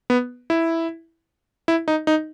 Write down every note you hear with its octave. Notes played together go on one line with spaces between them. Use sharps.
B3
E4
E4
D#4
D#4